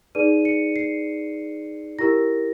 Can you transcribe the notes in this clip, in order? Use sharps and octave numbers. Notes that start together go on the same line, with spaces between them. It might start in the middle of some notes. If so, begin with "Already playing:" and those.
D#4 G#4 B4 D5 D#7
C#7
C7
E4 G4 A#4 A#6